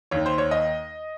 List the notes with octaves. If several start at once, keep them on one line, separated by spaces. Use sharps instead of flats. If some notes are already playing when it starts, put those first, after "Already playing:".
D#2 D#3 C#5
C5
C#5
D#5